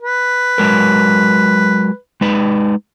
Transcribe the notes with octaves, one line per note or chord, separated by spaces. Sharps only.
B4
F#3 G#3 A#4
G#3 D#4 B4